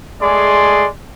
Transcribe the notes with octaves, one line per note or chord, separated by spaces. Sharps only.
G#3 A3 G#4 D5 C6